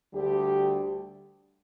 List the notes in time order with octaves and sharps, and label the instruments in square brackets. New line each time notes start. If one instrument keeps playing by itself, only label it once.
[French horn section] D2 D3 G3 G4